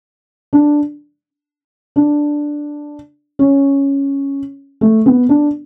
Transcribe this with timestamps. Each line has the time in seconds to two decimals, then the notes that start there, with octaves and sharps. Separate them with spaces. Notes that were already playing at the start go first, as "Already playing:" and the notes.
0.53 D4
1.96 D4
3.39 C#4
4.81 A3
5.06 B3
5.29 D4